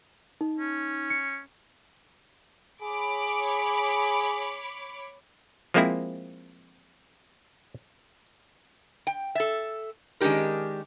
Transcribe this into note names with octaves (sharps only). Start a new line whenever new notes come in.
D#4
C#4
C#7
G#4 C#5 B5 D6
F3 G#3 A#3 C4 E4
G5
A4 E5
D#3 G#3 C#4 D4 G4 A#4